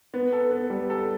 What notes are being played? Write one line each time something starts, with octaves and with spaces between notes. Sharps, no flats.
B3
A4
B3
G3
A4